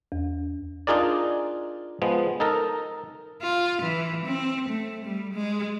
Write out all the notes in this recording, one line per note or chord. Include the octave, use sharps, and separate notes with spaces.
E2
D4 D#4 F4 G#4 A#4 D5
F3 G#3 B3
D#4 A4 A#4
F4
E3
C4
A3
G3
G#3